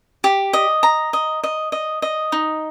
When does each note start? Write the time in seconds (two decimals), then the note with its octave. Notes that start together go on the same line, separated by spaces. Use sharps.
0.24 G4
0.53 D#5
0.83 A#5
1.13 D#5
1.43 D#5
1.72 D#5
2.02 D#5
2.32 D#4